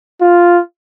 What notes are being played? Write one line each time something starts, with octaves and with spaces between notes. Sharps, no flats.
F4